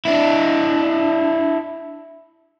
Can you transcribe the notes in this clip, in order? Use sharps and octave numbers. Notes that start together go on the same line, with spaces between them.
D4 E4